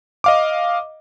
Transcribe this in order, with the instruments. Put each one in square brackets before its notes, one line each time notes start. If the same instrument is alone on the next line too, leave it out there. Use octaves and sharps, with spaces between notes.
[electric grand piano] D#5 F5 D6